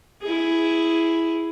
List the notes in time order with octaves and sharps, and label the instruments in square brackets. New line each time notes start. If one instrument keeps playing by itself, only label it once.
[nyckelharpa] E4 G#4